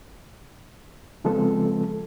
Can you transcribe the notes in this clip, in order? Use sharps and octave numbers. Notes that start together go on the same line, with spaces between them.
C#3 F3 G#3 B3 C4 A4